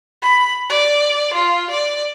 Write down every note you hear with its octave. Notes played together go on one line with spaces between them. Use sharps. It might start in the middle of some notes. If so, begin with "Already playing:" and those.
B5
D5
F4
D5